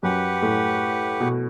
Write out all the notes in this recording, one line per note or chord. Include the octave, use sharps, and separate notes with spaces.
F#2 G4 B4 F#5
A2
B2